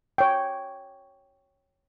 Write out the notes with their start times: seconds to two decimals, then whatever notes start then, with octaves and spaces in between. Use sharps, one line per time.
0.18 C#5 G5